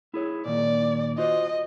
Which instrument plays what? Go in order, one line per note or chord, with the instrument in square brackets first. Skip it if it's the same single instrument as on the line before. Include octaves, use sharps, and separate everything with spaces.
[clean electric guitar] E4 G#4 C#5
[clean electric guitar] A#2 D#3 A#3 [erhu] D5
[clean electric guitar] F4 F#4 C5 [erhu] D#5